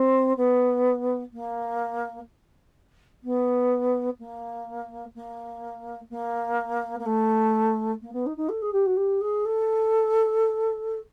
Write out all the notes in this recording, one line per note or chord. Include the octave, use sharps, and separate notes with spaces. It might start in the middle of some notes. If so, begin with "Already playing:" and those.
Already playing: C4
B3
A#3
B3
A#3
A#3
A#3
A#3
A3
A#3
B3
D#4
D#4
A4
G#4
G4
F#4
G4
G#4
A4